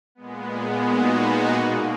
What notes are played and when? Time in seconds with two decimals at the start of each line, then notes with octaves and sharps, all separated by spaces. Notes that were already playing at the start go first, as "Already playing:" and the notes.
0.15 A#2 G#3 B3
0.83 D#4 F#4
1.52 B2 A#3